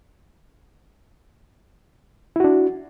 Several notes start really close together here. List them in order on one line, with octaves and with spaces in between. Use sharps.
E4 F#4 D4